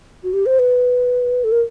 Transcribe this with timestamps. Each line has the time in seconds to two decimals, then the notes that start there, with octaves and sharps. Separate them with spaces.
0.24 F#4
0.33 G4
0.46 C5
0.59 B4
1.44 A4
1.52 A#4